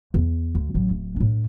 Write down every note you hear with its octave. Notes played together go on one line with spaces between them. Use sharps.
E2
D2
A1 F#3
D1
A2 D4